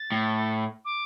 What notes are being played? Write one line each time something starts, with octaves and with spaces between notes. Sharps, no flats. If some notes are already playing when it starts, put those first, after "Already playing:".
Already playing: A6
A2
D6